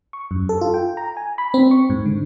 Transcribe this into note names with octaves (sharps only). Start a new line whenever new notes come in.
C#6
F#2
A4
F4
G5
A#5
G#5
B5
C4
C#6
G#2
D3